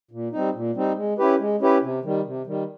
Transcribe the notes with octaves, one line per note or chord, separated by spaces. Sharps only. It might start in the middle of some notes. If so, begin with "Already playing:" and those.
A#2
G3 C4 D#4
A#2
G3 C4 D#4
G#3
C#4 E4 G4 B4
G#3
C#4 E4 G4 B4
C3
D#3 G3
C3
D#3 G3